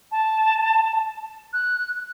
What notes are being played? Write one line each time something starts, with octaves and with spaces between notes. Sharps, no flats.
A5
F#6